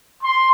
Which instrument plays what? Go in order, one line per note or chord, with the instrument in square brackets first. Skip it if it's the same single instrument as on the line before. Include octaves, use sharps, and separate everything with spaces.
[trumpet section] C6